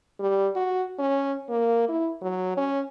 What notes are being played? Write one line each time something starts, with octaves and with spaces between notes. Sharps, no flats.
G3
F#4
C#4
A#3
E4
F#3
C#4